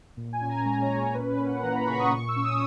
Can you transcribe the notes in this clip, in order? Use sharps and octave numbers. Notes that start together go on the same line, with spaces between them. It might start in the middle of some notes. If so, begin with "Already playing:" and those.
A#2
G#5
C#4
A#5
G#3 A#5
C#5
A#2
C#5
C#4 B4
A#3
F#5
E3 A#5
B5
C#3 C#6
D#6
A#2 C#6
E6
C#4
D#6